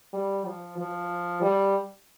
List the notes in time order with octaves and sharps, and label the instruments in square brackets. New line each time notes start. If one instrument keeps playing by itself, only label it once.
[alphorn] G3
F3
F3
G3